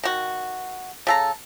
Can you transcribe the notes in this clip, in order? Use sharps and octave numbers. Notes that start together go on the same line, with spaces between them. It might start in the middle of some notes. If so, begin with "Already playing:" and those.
D#3 F#4
C#3 A4 A#5